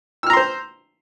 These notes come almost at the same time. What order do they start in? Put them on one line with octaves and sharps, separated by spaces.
E6 F6 A#5 C6 C5